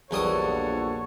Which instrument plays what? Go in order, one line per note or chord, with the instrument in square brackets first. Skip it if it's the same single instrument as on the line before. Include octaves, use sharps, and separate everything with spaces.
[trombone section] A#1 [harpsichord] E2 G3 D#6 [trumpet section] F#4 A4 C#5